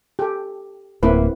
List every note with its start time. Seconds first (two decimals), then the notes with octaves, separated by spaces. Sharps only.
0.19 G4 A4
1.03 D1 A#3 C4 E4 B4